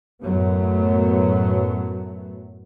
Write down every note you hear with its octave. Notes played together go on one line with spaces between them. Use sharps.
F#2 A2 F#3 A3 B3